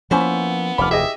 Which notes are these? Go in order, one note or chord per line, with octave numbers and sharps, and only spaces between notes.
F3 A#3 B3 C#4 E4 C5
F1 D#2 F3 B5 D6 F6
G4 G#4 D#5 E5